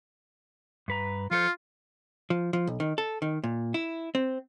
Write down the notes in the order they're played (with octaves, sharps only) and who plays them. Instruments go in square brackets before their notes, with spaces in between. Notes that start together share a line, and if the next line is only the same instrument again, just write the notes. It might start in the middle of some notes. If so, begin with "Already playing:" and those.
[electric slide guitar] G2 B4 A#5
[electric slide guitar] F3 A4 C5 [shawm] F4
[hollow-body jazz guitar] F3
F3
B1
D#3
A4
D#3
A#2
E4
C4